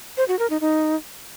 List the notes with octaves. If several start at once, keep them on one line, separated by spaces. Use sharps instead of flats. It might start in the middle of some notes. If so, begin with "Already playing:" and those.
C5
F#4
A#4
D#4
D#4